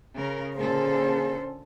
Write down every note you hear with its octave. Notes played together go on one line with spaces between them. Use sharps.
C#3 A#4
A#2 D3 A#3 C#4 G#4 A4 C5